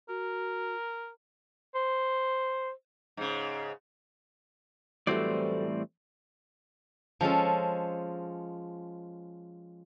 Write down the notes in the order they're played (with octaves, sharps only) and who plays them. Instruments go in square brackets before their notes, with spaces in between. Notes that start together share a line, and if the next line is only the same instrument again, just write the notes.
[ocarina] F#4 [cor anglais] A#4
[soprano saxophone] C5
[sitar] G#2 C#3
[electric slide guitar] A2 E3 G3 [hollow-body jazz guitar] F#3 A3 [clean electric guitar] C4 C5 D5
[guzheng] F3 G#3 C#4 A4